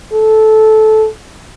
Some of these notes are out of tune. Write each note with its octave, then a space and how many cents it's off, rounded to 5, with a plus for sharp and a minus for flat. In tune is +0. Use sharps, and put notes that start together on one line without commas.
A4 -15